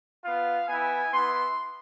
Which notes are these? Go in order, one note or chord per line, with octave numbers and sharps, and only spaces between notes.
B3 F4 F5
B3 E4 G#5
B3 E4 C6